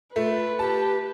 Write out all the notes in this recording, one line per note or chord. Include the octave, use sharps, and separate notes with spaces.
A3 F4 B4
G4 A5